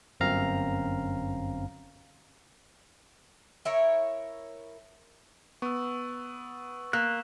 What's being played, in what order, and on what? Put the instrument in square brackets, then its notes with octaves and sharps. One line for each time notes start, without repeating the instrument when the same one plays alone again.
[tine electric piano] G1 F#2 C4 F5 A#5 F6
[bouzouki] E4 A#4 C#5
[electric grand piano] B3 [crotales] C#6 E6
[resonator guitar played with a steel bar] A#3 [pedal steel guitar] F#6 [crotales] B6 E7